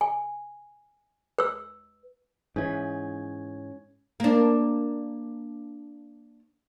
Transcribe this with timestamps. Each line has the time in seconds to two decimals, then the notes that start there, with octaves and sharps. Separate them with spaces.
0.01 G#5
1.38 B4 E6
2.56 G#2 E3 C#4 C#5 G#6
4.20 A#3 D4